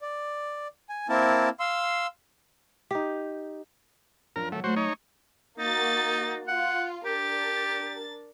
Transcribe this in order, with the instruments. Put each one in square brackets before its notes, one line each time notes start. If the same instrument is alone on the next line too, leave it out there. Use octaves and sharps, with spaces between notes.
[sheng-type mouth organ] D5
G#5
A#3 C4 E4 A#4 A5
F5 C6 E6
[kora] D#4 G4
[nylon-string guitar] F#2 F3 D4 [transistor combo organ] A#4
[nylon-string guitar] D#3 F#3 F#5 [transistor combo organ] A3
[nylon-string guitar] F#3 A3 [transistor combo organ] F#4 C5
[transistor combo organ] D#4 C#5
[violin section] A#3 F#4 A6 [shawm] D#4
[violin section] F4 [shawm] F#5
[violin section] D4 A#4 A6 [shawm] G4